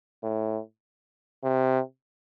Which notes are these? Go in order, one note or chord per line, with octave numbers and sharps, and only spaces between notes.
A2
C3